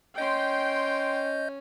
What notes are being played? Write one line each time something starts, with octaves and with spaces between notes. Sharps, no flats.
C#4 D#5 G5 C6 G6